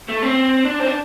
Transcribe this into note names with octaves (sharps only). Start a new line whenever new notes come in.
A3
C4
D4
C4
D4